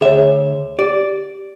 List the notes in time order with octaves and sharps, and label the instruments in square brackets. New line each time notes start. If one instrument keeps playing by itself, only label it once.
[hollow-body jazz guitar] D2 E5 [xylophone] G#4 C#5
[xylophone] G4 [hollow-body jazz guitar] D5